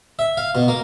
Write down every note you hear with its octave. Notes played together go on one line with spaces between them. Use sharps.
E5
F5
B2
A#3